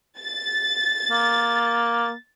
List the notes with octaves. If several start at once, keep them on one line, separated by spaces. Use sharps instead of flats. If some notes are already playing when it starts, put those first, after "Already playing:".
A6
A#3